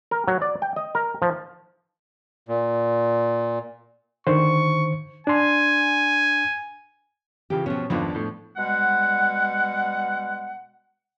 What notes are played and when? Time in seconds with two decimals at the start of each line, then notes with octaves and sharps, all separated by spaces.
0.11 A#4
0.28 F#3
0.42 D5
0.62 G5
0.76 D#5
0.95 A#4
1.22 F3
2.48 A#2
4.27 D3 D#3 C5 C#6
5.27 D4 G#5 C6
7.50 C#3 E3 F3 G4
7.66 B2 F3 C#4
7.90 G#1 F2 F3 B3 D4
8.15 A2
8.57 B2 G3 G#3 F#5